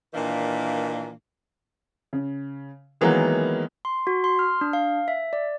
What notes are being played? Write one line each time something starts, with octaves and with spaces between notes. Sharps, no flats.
A#2 D#3 E3 A#3 D4
C#3
D#3 E3 F#3 G#3 A#3 B3
C6
F#4
C6
F6
D4
F5
E5
D5